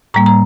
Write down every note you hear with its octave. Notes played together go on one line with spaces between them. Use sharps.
A2 G3 A#3 A#5
A#5